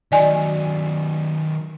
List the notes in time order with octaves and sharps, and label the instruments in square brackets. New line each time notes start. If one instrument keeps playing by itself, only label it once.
[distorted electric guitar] D#3 F#3 [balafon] D5 D#5 G#5